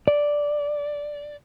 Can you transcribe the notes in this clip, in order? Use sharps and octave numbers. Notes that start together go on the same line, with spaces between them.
D5